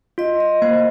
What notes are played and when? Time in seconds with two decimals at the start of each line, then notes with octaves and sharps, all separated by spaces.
0.18 F4 D#5
0.40 D#5
0.62 A#3 C5